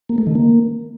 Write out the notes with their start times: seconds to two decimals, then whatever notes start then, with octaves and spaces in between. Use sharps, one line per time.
0.09 A#3
0.18 A3
0.27 D#3
0.35 A#3